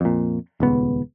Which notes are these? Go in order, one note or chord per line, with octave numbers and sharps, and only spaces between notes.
F2 A#2
D#1 C#2 B3